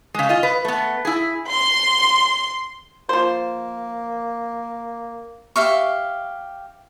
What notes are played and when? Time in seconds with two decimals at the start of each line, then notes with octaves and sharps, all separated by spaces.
0.14 C#3 G#3
0.29 F4 D#5
0.43 B4
0.65 A3 B3
1.05 E4 G#4
1.49 C6
3.09 F3 A#3 C5
5.56 G4 E5 F5 C#6